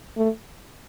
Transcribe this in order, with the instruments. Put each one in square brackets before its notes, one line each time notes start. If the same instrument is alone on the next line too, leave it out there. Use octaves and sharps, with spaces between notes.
[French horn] A3